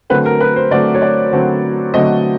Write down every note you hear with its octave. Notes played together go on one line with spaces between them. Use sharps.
D3 F#3 A3 C4 B4
A#4
B4
C5
D3 F#3 A3 C4 D5
C#5
D5
D3 F#3 A3 C4
D3 F#3 A3 C4 D#5